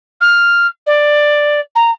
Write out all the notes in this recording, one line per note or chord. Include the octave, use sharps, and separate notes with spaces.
F6
D5
A#5